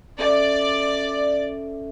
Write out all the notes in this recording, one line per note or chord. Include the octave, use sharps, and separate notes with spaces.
C#4 A4 D5 E5